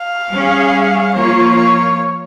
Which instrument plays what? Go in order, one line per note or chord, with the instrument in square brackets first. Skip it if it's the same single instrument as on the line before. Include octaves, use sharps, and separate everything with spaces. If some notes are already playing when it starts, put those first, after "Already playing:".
Already playing: [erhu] F5
[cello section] G3 C#4 G#4 C#5
[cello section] F3 A#3 F4 [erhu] C#5
[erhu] C#5